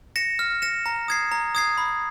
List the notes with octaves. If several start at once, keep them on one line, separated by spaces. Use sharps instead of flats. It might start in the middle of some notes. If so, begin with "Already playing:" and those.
A#6 C#7 E7
F6
A#6 C#7 E7
A#5
D#6 G#6 C7
A#5
D#6 G#6 C7
B5